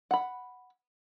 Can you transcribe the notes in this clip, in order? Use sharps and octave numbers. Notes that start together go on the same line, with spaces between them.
F#5 B5